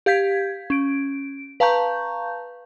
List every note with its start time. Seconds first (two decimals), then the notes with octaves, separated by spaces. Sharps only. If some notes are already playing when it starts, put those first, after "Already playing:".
0.06 G4 F5 G6 G#6 B6
0.70 C#4 D7
1.60 B4 F5 A5 A#5 C#6 G6